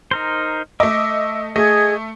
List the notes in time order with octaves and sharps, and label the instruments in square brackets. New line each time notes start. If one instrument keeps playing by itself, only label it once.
[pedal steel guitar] D#4 A#4 C5
[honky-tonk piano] A3 D#5 [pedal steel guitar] E5 D6
[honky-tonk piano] A3 [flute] G#4 [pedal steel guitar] D#5